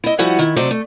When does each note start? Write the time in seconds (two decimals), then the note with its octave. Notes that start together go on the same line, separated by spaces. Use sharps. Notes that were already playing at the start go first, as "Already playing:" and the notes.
0.04 E4 D#5
0.18 F3 G3 E4 F#4 F#5 G#5
0.39 D#3 E4
0.57 C3 F#3 A3 C5 D5 D#5
0.71 A3